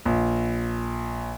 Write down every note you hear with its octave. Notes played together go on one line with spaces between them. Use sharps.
A#1